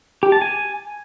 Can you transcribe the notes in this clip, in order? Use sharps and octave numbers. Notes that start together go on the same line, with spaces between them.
G4
A5
G#5